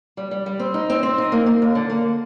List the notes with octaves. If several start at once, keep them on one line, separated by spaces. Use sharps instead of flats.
G3
G3
G3
C4
D#4
C4
C4
D#4
A#3
A#3
D#2
D3
A#3